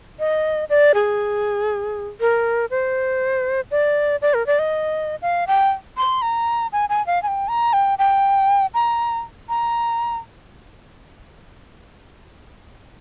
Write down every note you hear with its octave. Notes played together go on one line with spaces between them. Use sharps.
D#5
D5
G#4
A#4
C5
D5
D5
A#4
D5
D#5
F5
G5
C6
A#5
G#5
G#5
F5
G#5
G5
A#5
G5
G5
A#5
A#5